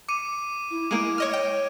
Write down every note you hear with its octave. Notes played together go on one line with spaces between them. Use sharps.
D6 C#7 D#7
E4
G#3 A#3 E4 D7 D#7
C#5 D#5 F6
C#5 G5